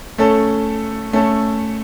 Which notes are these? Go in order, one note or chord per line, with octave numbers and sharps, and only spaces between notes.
A3 C#4 A4
A3 C#4 A4